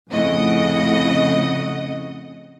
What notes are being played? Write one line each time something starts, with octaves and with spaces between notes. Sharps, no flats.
F2 A2 C#3 D#5 F#5 D#6